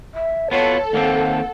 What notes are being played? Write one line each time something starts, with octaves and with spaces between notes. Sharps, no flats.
E5
B3 F4 F#4 A4 C#5
D#2 A#3 C4 F#5